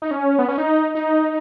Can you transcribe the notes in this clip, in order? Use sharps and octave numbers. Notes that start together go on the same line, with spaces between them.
D#4
C#4
B3
C#4
D#4
D#4